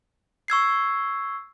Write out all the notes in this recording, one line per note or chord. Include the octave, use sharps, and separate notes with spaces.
C#6 E6 G#6 C7